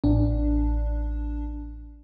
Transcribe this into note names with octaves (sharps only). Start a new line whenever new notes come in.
A1 D4